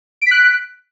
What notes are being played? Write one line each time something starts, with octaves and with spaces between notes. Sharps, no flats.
F#6 B6 D7